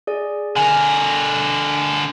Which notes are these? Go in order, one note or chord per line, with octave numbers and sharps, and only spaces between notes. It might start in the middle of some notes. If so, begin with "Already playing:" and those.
G#4 D5
D3 A#4 G#5